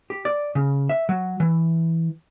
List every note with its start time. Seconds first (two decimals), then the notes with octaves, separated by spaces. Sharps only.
0.10 G4
0.25 D5
0.55 C#3
0.89 E5
1.09 F#3
1.40 E3